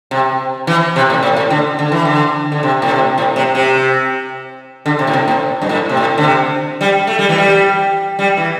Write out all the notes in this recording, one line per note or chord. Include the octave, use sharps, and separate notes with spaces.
C3
E3
C3
A2
A2
A2
D3
D3
E3
D3
D3
C3
A2
C3
A2
C3
C3
D3
C3
A2
C3
A2
G2
A2
C3
A2
D3
C3
G3
A3
G3
E3
G3
G3
E3